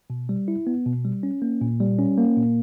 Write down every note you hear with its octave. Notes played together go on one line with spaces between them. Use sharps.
B2
G3
E4
B3
B2
G3
C#4
A#3
A#2
G3
C#4
A#3
A#2